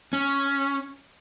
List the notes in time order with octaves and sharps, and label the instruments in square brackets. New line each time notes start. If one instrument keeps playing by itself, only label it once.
[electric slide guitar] C#4